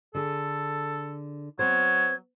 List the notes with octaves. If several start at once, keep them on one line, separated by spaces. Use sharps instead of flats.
D3 G#4 A4
F#3 B3 C4 C5 G#6